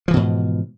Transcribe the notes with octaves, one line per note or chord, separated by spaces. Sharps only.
G#2 B2 E3 F3